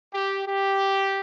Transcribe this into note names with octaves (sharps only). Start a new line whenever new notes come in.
G4
G4